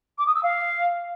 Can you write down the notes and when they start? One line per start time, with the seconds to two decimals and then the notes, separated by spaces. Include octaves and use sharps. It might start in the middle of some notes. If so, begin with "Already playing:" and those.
0.18 D6
0.27 D#6
0.35 E6
0.43 F5